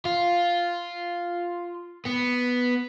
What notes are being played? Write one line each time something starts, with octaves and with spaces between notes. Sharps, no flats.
F4
B3